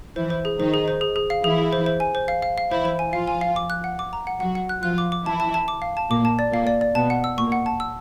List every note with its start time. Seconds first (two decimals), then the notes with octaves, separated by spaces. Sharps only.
0.16 E3 E4 C5
0.30 C5
0.45 G#4
0.59 D#3 D#4 C5
0.74 G#4
0.88 C5
1.01 G#4
1.16 G#4
1.30 F5
1.43 E3 E4 G#4
1.58 G#4
1.73 C5
1.86 C5
2.00 G#5
2.15 C5
2.28 F5
2.42 F5
2.58 F5
2.71 E3 E4 C5
2.85 C5
2.99 G#5
3.13 F3 F4 F5
3.28 G#5
3.41 F5
3.56 D6
3.70 F#6
3.84 F#5
3.99 D6
4.13 A#5
4.27 F#5
4.40 F#3 F#4 F#5
4.55 F#5
4.69 F#6
4.83 F3 F4 F#6
4.98 D6
5.12 D6
5.26 E3 E4 A5
5.40 A5
5.54 A5
5.68 D6
5.82 F5
5.97 A5
6.10 A#2 A#3 D6
6.25 A5
6.39 D5
6.52 A#2 A#3 F5
6.67 D5
6.81 D5
6.95 B2 B3 A5
7.10 F#5
7.24 E6
7.38 A#2 A#3 C#6
7.52 F#5
7.66 A5
7.80 E6